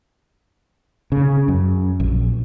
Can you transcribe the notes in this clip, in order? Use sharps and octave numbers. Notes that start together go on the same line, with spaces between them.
C#3
F#2
A#1